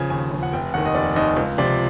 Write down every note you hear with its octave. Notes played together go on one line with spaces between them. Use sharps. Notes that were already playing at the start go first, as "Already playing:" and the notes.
Already playing: C#3 F3 G#5
D#2 G#5
C#3 F3
F#5
F1 G5
D#2 D#3 F#5
D#5
F1 D5
D#2 D#3 D#5
C#2
C3 F3 D5